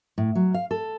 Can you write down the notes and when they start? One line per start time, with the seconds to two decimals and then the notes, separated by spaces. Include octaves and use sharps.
0.18 A2
0.35 F#3
0.54 F5
0.71 A4